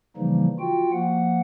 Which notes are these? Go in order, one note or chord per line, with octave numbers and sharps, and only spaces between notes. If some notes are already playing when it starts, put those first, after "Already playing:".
C#3 E3 F3 G3 A#3 D#4
F4 F#4 G5
F3 A#3 F#5